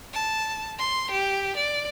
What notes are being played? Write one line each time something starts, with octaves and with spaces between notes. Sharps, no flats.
A5
C6
G4
D5